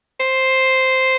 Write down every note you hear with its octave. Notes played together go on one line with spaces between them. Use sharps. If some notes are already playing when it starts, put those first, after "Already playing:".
C5